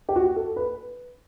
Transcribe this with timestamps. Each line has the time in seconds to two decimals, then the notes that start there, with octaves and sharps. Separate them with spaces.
0.09 G4
0.16 F#4
0.36 A4
0.56 B4